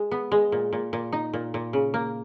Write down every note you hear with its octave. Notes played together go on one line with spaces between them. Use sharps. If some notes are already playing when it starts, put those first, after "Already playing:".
Already playing: G#3
B3
G#3
A#2
A#2
A#2
D#4
A#2
A#2
C#3
A#3